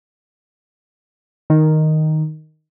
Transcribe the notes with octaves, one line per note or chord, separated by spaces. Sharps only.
D#3